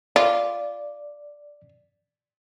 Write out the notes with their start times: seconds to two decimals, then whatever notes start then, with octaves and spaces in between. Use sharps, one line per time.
0.16 F4 D5